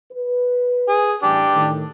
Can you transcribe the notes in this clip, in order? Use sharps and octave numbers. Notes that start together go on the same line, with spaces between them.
B4
G#4
A1 D4 G4
A2 D#3